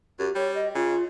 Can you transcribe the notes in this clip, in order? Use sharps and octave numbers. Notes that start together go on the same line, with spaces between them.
F#2 G4
G3 C#5
D#5
C#3 F4